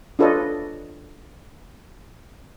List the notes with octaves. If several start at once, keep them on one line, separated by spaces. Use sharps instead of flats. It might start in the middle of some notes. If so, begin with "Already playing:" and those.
D4 F4 A4 B4 C#5 D#5